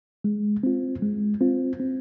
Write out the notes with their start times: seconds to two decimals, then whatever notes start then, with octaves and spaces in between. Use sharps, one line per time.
0.24 G#3
0.63 C4 F4
1.02 G#3
1.41 C4 F4
1.80 C4